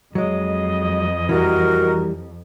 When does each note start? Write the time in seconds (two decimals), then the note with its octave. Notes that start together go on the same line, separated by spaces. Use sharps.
0.15 F2 F#3 G#3 D#5
1.29 E3 G3 F#4 A#4